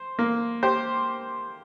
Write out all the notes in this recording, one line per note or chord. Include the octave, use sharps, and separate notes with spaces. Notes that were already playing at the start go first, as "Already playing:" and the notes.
Already playing: C5
A#3
G4 C5